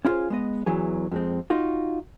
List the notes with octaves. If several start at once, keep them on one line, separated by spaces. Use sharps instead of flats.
C#4 E4 F4 G4 G#4 C5
G#3 B3 D#5
E2 E3 F#3 G#4
F2 G#3 C4
D#4 F4 F#4